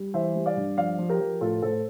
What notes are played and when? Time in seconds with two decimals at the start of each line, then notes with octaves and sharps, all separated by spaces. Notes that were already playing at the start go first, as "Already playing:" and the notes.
Already playing: G3
0.14 E3 C5 E5
0.35 G3
0.46 D5 F5
0.57 G2
0.77 F3 D5 F5
0.99 F3
1.09 G4 A#4
1.20 F3
1.41 A2 F4 A4
1.62 A2 A4 C5